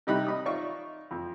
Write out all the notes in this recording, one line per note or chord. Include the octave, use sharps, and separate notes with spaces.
C3 G3 D#4 E4 B5 F#6
D#5 B5 D#6
D#4 F4 D5 E5 C#6
F2